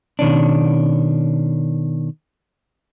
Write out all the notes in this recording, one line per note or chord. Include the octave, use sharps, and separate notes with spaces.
B2 D#3 C#4 D4